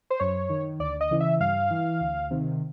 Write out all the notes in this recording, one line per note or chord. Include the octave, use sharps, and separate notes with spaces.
C5
F#2 C#5
D#3
D2 D5
D#5
C#3 E3
E5
G2 F5
E3
D2
C3 D#3